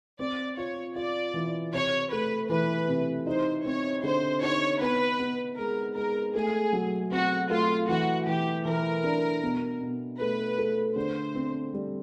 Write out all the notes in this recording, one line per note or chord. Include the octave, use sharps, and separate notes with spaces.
C4 D5
F4 C#5
F4 D5
E3
C3 C#5
A3 B4
E3 B4
C3
D#4 C5
C4 C#5
D3 C5
D#4 C#5
B3 B4
B3
G#3 A#4
G#3 A#4
A3 G#4
F#3
C4 F#4
A3 F4
E3 F#4
E3 G4
E3 A#4
D4
B2
B2
A3 B4
A3
D3 C5
C4
G3